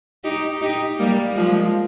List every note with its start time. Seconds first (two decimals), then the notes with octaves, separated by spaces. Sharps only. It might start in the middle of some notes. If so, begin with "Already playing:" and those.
0.24 D#4 G4
0.61 D#4 G4
0.99 G3 A#3
1.37 F3 G#3